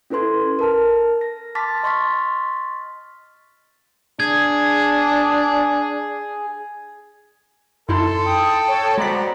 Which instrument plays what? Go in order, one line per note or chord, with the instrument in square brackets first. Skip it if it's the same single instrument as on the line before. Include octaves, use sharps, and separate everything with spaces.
[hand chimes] C#4 E4 A4 B4 C6 G#6
A#4 A5 F6
A#6
A5 C6 D6 F6 A6 B6
D#5 C6 C#6 F6 A6 B6
[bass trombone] D4 [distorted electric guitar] G#4 [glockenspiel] G#6
[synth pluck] F#2 D#4 E4 [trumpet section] A4 [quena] C6
[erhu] G5 [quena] D#6
[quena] C#5
[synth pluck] G#3 B6 [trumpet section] B3 C5 D5 [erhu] F#4 [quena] A#5